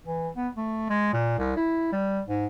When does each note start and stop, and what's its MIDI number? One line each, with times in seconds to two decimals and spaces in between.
0.07 0.29 52
0.36 0.48 59
0.56 0.89 57
0.90 1.13 56
1.13 1.37 46
1.38 1.54 36
1.56 1.89 64
1.92 2.21 55
2.29 2.46 44